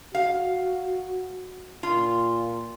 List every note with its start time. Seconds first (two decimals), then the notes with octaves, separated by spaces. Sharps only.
0.15 F#4 F5
1.83 A#2 F4